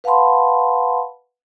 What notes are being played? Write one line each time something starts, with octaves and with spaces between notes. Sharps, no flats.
B4 F5 F#5 A5 B5 C6